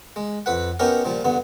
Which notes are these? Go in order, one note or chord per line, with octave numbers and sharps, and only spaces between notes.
G#3
F2 B4 F#5
B3 C#4 D#4 G4 A#4
A#2 F3 G3
G2 D3 B3